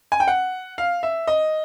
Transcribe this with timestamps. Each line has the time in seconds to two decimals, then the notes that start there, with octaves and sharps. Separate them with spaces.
0.12 G#5
0.20 G5
0.28 F#5
0.78 F5
1.03 E5
1.27 D#5